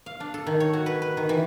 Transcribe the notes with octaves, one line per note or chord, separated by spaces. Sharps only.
F5
D4
A4
D#3
C#5
F#4
B4
B4
D#3
E3